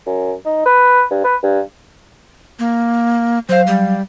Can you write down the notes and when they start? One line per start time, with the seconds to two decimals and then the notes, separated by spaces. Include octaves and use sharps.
0.06 F#2
0.46 D#4
0.66 B4
1.11 G2
1.24 B4
1.43 G2
2.59 A#3
3.49 F#3 C5 F5
3.67 G3